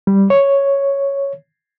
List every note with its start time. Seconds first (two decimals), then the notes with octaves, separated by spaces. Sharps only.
0.07 G3
0.30 C#5